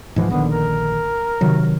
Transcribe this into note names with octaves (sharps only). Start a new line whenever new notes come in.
G#2 E3 F3
A#1 D3 D#3 B3
A#4
C3 D#3 F#3